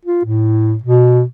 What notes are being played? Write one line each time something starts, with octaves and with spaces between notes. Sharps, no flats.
F4
A2
B2